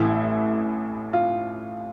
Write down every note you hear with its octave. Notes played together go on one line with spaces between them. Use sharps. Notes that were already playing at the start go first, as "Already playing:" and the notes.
Already playing: A1 A2 E3 E4
F4